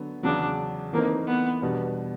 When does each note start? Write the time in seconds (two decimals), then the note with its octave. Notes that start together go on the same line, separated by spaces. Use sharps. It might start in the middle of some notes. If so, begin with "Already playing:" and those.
Already playing: D3 F#3 B3
0.23 E2 C#3 F#3 D4
0.93 E3 A3 A#3 C4 D#4
1.27 B3
1.62 E2 B2 G3 B3 D4